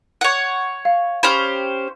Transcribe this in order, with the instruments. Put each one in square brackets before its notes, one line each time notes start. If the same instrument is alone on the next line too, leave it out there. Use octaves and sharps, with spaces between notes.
[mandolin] C#5 F#5
[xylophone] F5
[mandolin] C#4 G4 C5 [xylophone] B5